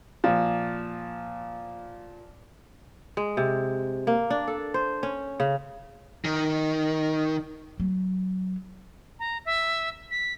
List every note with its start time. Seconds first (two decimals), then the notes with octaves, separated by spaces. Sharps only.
0.24 A#2 F3
3.17 G#3
3.37 C3
4.07 A#3
4.30 D4
4.48 A4
4.74 C5
5.03 C#4
5.40 C#3
6.25 D#3
7.80 F#3
9.19 A#5
9.45 E5
10.11 B6